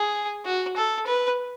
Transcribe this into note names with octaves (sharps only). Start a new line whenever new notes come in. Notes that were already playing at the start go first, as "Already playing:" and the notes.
Already playing: G#4
F#4
A4
B4